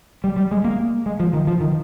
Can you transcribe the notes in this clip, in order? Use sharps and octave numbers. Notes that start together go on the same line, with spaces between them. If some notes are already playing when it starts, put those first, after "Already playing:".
G3
G3
G#3
A#3
G#3
F3
D#3
F3
D#3